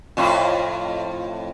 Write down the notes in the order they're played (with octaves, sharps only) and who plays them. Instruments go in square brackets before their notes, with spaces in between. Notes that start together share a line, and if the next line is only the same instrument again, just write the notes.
[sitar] F2 A2 F4